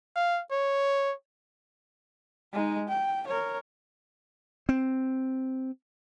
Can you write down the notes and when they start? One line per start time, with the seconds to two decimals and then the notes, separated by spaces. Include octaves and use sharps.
0.16 F5
0.52 C#5
2.53 G#3 D#4
2.89 G5
3.28 A#4 C#5
4.69 C4